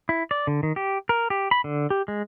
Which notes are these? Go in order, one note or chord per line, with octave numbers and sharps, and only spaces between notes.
E4
D5
D3
D#3
G4
A#4
G4
B5
D3
G4
G#3